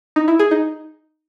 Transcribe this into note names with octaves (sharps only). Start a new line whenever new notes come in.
D#4
E4
G#4
D#4